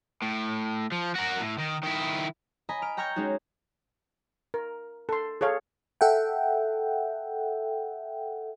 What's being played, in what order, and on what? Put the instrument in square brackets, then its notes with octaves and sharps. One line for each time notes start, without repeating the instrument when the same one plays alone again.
[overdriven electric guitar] A2
F3
F#4 A#4
A2
D#3
D#3 E4
[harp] D#5 G#5 A#5 B5
F6 D7
G5 A#5 C#6 F6 G6 G#6
G#3 C#4 D#4 F#4
[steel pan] A#4
A4 C6
G#4 A4 C#5 F5
[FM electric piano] A4 E5 F#5 G5